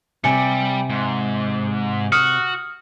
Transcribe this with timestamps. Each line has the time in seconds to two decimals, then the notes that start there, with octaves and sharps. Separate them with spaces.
0.24 C3 G3 G#5 C#7
0.90 G#2
2.12 F#4 D#6 F6 C#7